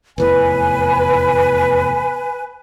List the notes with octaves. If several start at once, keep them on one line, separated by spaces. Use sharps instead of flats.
F1 E2 A2 B4 G#5